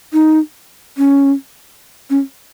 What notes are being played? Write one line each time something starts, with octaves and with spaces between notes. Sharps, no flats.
D#4
C#4
C#4